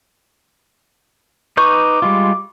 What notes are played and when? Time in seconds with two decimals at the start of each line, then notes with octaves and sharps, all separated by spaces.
1.57 D#4 B4 C#6 D6 G6
2.02 G3 G#3 F4